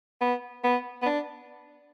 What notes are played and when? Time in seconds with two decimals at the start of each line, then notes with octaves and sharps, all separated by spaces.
0.21 B3
0.64 B3
1.02 B3
1.06 D4